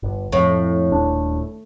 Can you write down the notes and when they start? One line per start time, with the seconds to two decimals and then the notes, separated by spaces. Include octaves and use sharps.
0.03 G1
0.32 F2 A2
0.90 D#1 D4